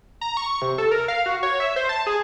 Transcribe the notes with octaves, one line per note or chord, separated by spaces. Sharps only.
A#5
C#6
C3
A4
A#4
F5
F#4
C#5
E5
C5
A5
G#4